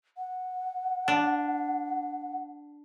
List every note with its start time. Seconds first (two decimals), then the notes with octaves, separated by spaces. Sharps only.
0.17 F#5
1.08 D4